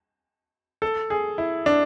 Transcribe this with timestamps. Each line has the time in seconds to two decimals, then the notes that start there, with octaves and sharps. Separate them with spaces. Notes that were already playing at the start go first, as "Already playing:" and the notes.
0.82 A4
1.10 G#4
1.38 E4
1.66 D4